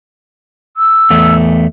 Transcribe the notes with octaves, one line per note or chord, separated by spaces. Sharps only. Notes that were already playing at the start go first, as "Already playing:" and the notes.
E6
E2 A3